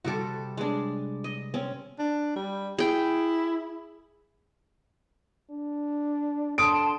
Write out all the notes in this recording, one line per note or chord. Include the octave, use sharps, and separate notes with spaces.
C3 G3 F#4 G4 A4
G#3 D4
D#5
C4 C#4
D4
G3
E4 G#4 G5
D4
D3 A5 C6 D#6 D7